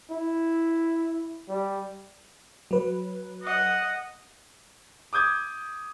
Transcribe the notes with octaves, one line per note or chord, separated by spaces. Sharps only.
E4
G3
F#3 B4
D#5 F#5
D6 D#6 G6 G#6